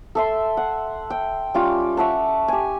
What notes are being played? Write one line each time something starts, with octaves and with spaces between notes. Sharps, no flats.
A4 E5 C6
F#5
G5
G3 C#4 F4
C#5 E5 F#5 A5
G4 G#5